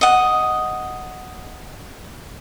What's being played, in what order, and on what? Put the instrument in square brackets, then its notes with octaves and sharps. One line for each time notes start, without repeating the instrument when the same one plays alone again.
[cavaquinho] D#5 F#5